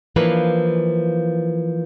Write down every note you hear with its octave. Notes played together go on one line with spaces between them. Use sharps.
E3 F3 A#3 D4 B4